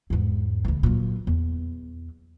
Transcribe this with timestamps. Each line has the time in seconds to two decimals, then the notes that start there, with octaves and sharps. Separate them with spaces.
0.10 E2 G#2
0.65 D2 E3
0.83 A#2 F#3
1.27 E2